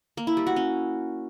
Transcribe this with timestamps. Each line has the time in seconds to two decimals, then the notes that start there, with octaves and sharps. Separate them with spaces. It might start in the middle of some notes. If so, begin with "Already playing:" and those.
0.17 A#3
0.27 E4
0.37 G3
0.47 F#4
0.56 C#4